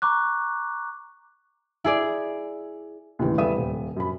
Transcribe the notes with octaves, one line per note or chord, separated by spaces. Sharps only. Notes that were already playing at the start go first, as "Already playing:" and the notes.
A#5 C#6 D6 F#6
E4 G#4 D5
D#2 A2 C#3 E3
E2 G3 A3 E5 D#6 D#7
D#1
F#2 B5